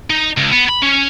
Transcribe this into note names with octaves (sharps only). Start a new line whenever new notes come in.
D#4
C#2
B3
B5
C#4